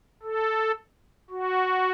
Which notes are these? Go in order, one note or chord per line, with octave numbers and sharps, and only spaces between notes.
A4
F#4